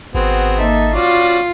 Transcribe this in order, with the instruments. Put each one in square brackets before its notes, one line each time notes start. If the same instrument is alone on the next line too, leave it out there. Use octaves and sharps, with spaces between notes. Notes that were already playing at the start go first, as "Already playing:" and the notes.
[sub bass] G#1 [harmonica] B3 C4 [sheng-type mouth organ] F#4 G#4
[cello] A#3 [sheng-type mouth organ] D#4 A4 E5
[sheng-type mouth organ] C#4 [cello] F4 [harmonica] F#4 D5